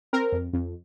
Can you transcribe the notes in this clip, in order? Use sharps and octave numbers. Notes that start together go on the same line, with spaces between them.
C4 A#4
F2
F2